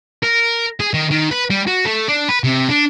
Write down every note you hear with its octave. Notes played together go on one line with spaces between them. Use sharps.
A#4
G#4
D#3
D#3
B4
G3
F#4
A3
D4
B4
C3
D4